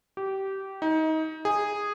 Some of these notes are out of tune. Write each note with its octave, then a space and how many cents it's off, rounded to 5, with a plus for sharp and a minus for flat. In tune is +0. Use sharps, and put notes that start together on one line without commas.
G4 -20
D#4 +25
G#4 -10